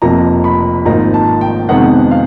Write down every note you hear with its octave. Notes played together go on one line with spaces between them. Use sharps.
F1 F2 C3 F3 A#3 A#5
B5
G#1 G#2 F3 A#3 D#4 A#5
A5
G5
F2 C3 D#3 G#3 B3 F#5
F5